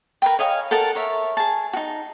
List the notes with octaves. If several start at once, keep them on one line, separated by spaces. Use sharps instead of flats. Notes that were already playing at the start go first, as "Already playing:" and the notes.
A#4 B4 G5
C#5 D#5 F5 G#5
A4 A#4 F#5 A5
A#4 C#5 E5
G#4 A5
D#4 F#4